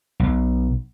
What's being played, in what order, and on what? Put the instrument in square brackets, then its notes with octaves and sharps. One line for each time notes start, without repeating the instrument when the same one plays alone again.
[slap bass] B1